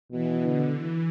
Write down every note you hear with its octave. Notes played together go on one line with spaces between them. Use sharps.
B2 E3
D3
E3